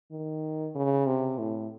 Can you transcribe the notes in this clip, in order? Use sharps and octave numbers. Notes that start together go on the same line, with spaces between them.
D#3
C#3
C3
A2